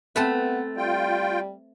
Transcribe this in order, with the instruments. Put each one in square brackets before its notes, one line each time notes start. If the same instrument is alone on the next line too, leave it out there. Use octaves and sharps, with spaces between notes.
[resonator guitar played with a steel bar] A3 [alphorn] B3 [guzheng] C4 A4 B4
[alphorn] G3 [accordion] F4 G5